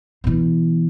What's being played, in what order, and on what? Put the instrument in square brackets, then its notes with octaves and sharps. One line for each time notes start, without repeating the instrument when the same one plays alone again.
[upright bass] B2 E3